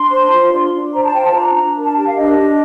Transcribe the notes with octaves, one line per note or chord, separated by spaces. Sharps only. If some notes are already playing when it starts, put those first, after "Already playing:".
Already playing: D4 C6
C5
F4
D4
D4
C5 A#5
A5
F4 G5
A5
D4 A#5
D4 A#5
A#4
A5
G4 A5
F5
D4 D#5
D4